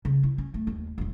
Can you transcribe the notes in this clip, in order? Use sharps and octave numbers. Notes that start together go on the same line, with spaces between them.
C#3
E4
C#4
A3
D#2
E1 E2